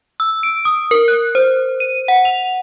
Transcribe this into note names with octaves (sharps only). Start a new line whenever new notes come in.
E6
D7
D#6
A#4
F#6
C5
D#7
F#5
F7